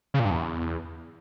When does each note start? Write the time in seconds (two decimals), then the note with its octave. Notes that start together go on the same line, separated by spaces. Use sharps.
0.14 C#3
0.20 A#2
0.25 G2
0.31 E2